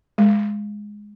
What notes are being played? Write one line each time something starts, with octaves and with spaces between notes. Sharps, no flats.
G#3